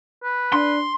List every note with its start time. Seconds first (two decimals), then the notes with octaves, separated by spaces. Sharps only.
0.23 B4
0.53 D4 C6